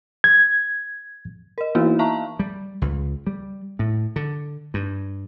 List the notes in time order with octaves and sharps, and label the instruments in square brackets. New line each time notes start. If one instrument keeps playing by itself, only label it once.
[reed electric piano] G#6
[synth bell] A#4 D#5
E3 A#3 B3 D#4 E4 F#4
E5 F5 A5 A#5 C#6
[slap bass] G3
C#2
G3
A2
D3
G2